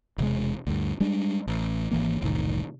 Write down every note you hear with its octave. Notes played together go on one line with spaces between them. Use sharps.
E1 C3 G#3
D2 G2
G3 G#3 D4
A1
G#1 D#2 E3 A#3
E1 C2 A2 D#3